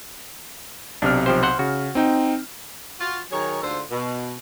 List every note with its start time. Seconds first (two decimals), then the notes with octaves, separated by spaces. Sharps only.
1.02 B1 C3 D4 F6
1.26 F3 G4 C5
1.43 C5 F#5
1.59 C#3 F#4
1.95 C4 D#4 G5
3.00 F4 F#4
3.31 D#3 F#3 G#4 A#4 C#5
3.62 D2 G#2 D3 F4 A4 C5
3.90 B2